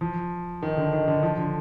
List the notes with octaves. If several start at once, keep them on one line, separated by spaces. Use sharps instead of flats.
F3
D#3
D3
D#3
D3
F3
D3